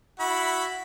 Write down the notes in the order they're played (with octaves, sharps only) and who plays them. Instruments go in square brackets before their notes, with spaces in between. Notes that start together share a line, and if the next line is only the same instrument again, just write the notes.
[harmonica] E4 F#4 B5